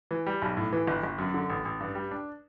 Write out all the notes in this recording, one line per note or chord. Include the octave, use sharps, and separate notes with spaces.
E3
G3
B1
A2
E3
G1
G1
F#2
D3
A1
A1
G2
G3
D4